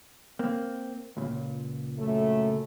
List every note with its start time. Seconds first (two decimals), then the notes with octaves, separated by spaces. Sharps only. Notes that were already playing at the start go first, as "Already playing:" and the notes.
0.39 A#3 C4
1.17 C#2 A#2
1.98 F#2 A3